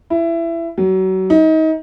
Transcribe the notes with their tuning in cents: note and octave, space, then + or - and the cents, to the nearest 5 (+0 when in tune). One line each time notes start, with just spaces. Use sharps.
E4 +20
F#3 +30
D#4 +30